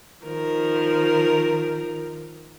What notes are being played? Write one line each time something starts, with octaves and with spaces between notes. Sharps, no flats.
D#3 F3 A#4